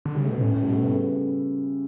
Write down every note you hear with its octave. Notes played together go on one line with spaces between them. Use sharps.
D3
C#3 G3
A3
B2 B3
A2 C#4
A2
G3
B2 A3
A2 B3
C#3